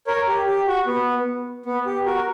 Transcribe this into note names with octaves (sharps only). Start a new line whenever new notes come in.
A#4 C#5
G4
G4
F#4
B3
B3
G4
F#4 A#4
A#4